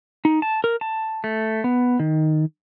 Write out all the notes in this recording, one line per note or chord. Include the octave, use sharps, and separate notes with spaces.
D#4
A5
A#4
A5
A3
B3
D#3